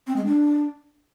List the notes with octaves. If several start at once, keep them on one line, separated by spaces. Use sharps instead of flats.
C4
G#3
D4